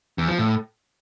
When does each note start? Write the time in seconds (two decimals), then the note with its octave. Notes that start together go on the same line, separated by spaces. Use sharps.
0.18 E2
0.28 F3
0.39 A2